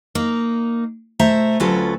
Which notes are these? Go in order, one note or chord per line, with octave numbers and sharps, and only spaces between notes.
A#3 D#4
B2 A3 C5 E5 A#5
D2 F#3 C#4 F4 A4 B4